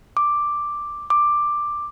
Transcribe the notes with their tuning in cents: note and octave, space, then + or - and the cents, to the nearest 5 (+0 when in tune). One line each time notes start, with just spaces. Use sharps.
D6 +5
D6 +10